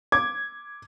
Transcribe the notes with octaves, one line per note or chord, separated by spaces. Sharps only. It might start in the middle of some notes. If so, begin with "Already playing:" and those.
D6 G#6